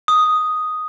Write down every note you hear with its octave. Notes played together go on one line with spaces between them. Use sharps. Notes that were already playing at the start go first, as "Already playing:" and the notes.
D#6